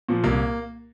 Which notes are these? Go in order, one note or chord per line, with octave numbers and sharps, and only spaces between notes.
A#2 F3
C2 A#3